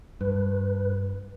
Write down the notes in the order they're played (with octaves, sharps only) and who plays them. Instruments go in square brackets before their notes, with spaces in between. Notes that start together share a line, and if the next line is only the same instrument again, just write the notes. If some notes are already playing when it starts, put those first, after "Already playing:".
[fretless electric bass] G2 [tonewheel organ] B4